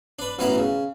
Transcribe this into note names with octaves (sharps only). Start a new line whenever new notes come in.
D4 B4
A1 B2 E3 E4 A#4 A#5
C#3